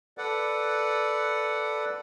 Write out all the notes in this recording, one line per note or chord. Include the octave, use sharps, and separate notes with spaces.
A4 B4 D5 F#5